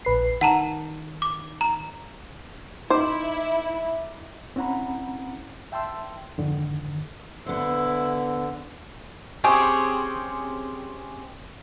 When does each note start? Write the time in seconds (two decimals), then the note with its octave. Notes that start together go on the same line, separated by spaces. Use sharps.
0.05 A#1 B4 C7
0.41 D#3 F#5 A5 A#5
1.22 D6
1.61 A#5
2.90 D#4 E4 C5 D6
4.56 C4 C#4 E4 F#5 A#5 B5
5.72 E5 G5 A5 C6 E6
6.38 F2 G#2 D3 D#3
7.46 D3 B3 E4 C5
9.44 C4 C#4 G4 G#4